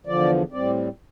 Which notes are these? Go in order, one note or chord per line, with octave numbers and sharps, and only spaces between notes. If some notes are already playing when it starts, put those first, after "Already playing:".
E2 D3 F3 D5
A2 G3 C4 D5